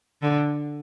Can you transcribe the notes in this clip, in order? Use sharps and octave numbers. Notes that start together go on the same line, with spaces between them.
D3